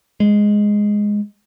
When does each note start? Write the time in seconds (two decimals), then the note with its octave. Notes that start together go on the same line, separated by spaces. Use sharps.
0.20 G#3